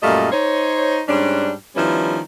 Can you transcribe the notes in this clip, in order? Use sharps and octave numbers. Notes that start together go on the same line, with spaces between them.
F#2 A#2 G3 A3 D#5 F5
D#4 C5 C#5
G#2 G3 C#4 D4
D#3 F3 G3 B3 C#4 E4